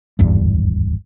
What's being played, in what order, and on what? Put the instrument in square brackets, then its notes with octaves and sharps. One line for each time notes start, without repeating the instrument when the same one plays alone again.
[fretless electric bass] D1 G#1 E2 G2